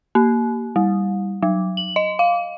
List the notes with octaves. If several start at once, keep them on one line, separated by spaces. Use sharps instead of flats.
A#3
G3
F#3
F#7
D#5
F5